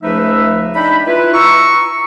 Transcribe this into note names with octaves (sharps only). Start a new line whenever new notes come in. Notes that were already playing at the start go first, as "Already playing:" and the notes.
C#2 F3 A3 D#4 B4 E5
D4 D#4 D#5 E5 G5 B5
E4 F4 B4
A#5 C#6 E6